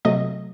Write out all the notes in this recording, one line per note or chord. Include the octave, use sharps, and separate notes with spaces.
C3 F#3 A3 D#5